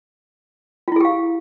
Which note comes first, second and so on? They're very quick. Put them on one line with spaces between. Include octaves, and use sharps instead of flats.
F4 E4 G#4 G4 F5